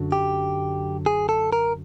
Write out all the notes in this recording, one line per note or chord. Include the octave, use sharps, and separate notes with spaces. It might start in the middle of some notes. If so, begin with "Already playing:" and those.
Already playing: F#2 D3 F#3
G4
G#4
A4
A#4